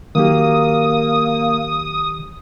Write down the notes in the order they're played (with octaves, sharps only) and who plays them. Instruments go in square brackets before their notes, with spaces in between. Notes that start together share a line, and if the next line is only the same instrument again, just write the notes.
[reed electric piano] D#3 F#3 G4 [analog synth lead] A#3 [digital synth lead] D#6